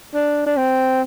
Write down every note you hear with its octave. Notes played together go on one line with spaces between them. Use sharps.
D4
D4
C4